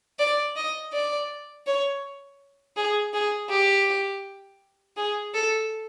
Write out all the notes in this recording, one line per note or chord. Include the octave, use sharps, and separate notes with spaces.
D5
D#5
D5
C#5
G#4
G#4
G4
G#4
A4